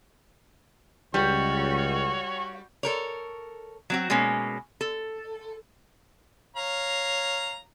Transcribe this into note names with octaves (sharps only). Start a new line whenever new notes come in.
C#2 G3 F#4 C#5
A4 A#4 C#5
F#3 C4 F#4
B2 G#3 A#3 C#4
A4
C#5 F5 A#5